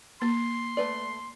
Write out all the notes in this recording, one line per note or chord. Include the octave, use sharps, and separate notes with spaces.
A#3 C6
A3 B4 D5